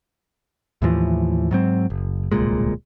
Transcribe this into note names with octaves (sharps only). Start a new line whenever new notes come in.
D#2 A2 E3 F3
G#2 F#3 C4
F#1
D1 C2 A#2 G#3